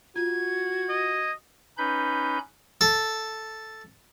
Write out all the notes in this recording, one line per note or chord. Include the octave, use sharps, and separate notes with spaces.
F4 F#4 G#6
D#5
C#4 D#4 B4 B5 G6
A4